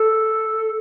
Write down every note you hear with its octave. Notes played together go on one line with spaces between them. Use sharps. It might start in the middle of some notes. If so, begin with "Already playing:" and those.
Already playing: A4